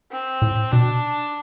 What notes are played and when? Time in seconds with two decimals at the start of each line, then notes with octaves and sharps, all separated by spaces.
0.11 C4
0.42 A2
0.72 B2 D4